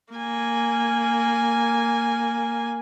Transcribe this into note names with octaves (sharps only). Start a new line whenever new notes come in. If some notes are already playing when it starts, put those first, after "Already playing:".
A#3 G#5